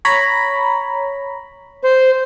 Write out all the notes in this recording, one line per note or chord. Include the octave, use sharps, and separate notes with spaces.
C#5 A#5 B5
C5